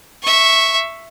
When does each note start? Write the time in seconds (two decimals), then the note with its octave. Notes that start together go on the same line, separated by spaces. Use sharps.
0.23 E5 C#6